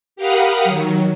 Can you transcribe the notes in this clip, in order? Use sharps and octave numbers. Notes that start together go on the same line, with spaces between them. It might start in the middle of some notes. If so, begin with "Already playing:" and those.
G4 A#4 F5 F#5 B5 D#6
D#3 F#3